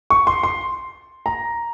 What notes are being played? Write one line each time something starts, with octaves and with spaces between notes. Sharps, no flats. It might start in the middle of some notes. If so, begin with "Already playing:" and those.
C#6
C6
C6
A#5